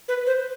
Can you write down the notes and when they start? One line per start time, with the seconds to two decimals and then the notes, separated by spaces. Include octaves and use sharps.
0.08 B4
0.26 C5